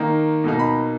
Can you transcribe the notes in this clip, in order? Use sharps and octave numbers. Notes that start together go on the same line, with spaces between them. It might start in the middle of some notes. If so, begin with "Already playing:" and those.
Already playing: D#3 A#3 D#4
B2 A#3 D#4
B5